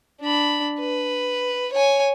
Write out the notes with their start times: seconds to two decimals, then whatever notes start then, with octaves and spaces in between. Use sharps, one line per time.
0.21 D4 B5
0.80 B4
1.72 C#5 G#5